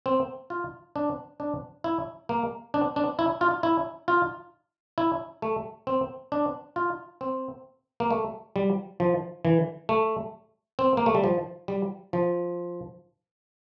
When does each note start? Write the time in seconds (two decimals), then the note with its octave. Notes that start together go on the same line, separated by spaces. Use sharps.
0.06 C4
0.50 F4
0.96 D4
1.40 D4
1.84 E4
2.29 A#3
2.74 D4
2.96 D4
3.19 E4
3.41 F4
3.63 E4
4.08 F4
4.98 E4
5.42 A3
5.87 C4
6.32 D4
6.76 F4
7.21 C4
8.00 A#3
8.11 A3
8.56 G3
9.00 F3
9.45 E3
9.89 A3
10.79 C4
10.97 A#3
11.06 A3
11.15 G3
11.24 F3
11.68 G3
12.13 F3